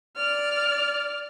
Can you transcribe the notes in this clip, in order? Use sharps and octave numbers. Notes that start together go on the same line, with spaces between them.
D5 F6